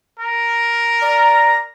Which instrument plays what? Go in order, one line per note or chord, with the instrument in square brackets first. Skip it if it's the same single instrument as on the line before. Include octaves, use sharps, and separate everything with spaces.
[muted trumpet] A#4
[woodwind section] D5 A#5